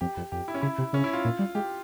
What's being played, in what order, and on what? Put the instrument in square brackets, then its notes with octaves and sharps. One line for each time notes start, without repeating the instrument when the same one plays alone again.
[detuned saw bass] F2 [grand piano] G4
[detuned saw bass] F2
[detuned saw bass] F2 [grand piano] G4
[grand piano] E4
C#4
[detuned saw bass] C#3 [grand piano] E4
[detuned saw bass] C3
[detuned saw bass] C#3 [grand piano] C#4
[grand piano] E4
F4
[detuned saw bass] A#2
G3
[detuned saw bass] G#3 [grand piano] G4